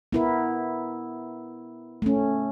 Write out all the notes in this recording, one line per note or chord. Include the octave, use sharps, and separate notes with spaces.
B3 E4 A#4
A3 C#4